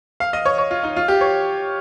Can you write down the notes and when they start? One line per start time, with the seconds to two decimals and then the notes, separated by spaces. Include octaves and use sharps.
0.20 F5
0.33 D#5
0.45 C#5
0.58 C#5
0.71 F4
0.83 D#4
0.96 F4
1.08 G4
1.21 C#5